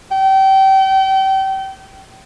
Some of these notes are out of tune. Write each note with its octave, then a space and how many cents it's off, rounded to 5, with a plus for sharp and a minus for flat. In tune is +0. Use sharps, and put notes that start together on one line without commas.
G5 -30